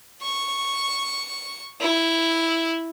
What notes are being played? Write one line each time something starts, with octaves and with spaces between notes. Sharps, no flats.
C#6
E4